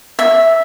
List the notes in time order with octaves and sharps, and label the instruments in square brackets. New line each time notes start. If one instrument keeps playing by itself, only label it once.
[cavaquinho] E5